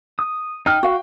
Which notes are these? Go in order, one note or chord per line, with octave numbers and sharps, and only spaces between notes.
D#6
D#4 G5 F6
F#4 F5 F#5